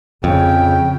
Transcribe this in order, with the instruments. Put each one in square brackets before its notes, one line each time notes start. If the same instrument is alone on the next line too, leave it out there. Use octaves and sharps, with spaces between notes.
[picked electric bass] F2 [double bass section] C#3 [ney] G5